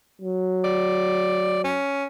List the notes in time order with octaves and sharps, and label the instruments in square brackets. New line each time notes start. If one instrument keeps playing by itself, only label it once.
[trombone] F#3
[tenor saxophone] D5
C#4